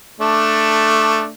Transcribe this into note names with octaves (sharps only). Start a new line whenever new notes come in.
A3 D4